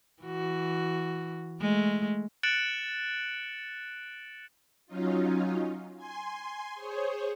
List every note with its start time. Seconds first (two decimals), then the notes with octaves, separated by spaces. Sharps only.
0.23 E3 F#4
1.61 G#3 A3
2.43 F#6 A6 C#7 D7 E7 F#7
4.87 F#3 C#4 D#4 F4
5.96 G#5 C6
6.74 G#4 C5 C#5